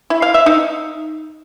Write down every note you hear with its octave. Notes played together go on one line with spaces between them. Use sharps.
E4
F5
E5
D#4